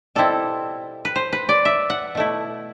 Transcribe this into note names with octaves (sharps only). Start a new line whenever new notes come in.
B2 G3 C4 E4 A4
B4
C5
B4
D5
E5
F#5
B2 A3 E4